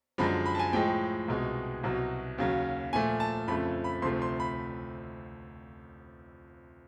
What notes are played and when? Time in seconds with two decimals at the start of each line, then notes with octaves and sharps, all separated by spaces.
0.18 F#2 D3 F3 G#3 B5
0.46 B5
0.55 A5
0.59 G#5
0.73 A2 F3 G#3 G5
1.28 C2 B2 G#3
1.83 C2 B2 F#3
2.38 D#2 C#3 F#3
2.93 A#2 F3 A3 G#5
3.20 A5
3.48 F2 C#3 F3 A3 B5
3.84 B5
4.02 D2 C3 F3 A3 C6
4.22 C6
4.40 B5